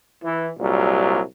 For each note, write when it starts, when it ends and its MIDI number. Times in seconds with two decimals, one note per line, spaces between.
0.24 0.49 52
0.59 1.19 36
0.59 1.19 46
0.59 1.19 54
0.59 1.19 55